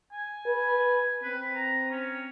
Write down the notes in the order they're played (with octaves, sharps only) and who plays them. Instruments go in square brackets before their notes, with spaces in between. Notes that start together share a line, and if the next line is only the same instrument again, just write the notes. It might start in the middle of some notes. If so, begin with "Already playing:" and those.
[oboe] G#5
[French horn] B4
[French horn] C4 [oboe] B4
[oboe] A#5
C#4